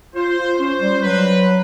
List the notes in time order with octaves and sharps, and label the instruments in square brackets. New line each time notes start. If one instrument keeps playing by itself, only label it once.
[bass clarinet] F4 [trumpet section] C5
[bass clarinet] F4
[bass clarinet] C#4 [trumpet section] C5
[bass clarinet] G3
[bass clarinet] F#3 [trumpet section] B4